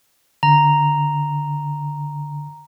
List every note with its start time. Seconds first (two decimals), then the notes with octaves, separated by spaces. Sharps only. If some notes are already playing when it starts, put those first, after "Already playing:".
0.43 D3 A#5